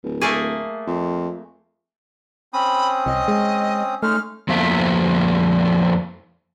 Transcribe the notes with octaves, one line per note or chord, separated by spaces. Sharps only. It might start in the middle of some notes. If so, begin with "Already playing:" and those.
D1
A3 A#3 G#4
F2
C4 C#4 B5 D#6
C2 D#5
G#3
G#3 A3 C#4 D#4 F6
F2 F3 A3 A#3 E5